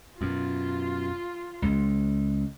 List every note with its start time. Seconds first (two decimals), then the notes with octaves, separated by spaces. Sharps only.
0.21 F#2 B2 F4
1.62 C#2